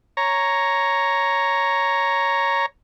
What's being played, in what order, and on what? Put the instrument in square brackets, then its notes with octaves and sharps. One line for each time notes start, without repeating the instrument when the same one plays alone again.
[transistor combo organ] C#5 A#5